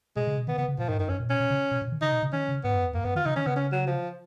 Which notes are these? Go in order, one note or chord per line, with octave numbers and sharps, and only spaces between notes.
B2 G#3
C#3
B2
D#3 B3
C#3 B3
C#3
A#2 F3
G#2 D#3
F#2 D#3
F#2 C#4
A#2
B2 C#4
B2
C#3
B2
A#2
D#3
C#3 D#4
B2
C#3
D#3 C#4
C#3
G#2 B3
F#2
F2
F#2 A#3
F#2 B3
D#3 F4
C#3 D#4
D#3 C#4
C#3 B3
C#4
F#3
F3